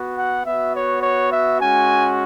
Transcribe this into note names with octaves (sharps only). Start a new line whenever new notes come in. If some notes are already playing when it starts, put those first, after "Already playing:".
Already playing: B3 F#4
F#5
B3 F#4 E5
C#5
C#5
E5
G#3 C#4 F#4 G#5